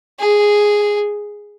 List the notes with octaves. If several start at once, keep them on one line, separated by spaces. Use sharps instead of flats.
G#4